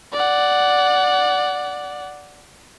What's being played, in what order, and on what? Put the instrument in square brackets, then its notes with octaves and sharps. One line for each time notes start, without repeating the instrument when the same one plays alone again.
[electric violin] D5 F#5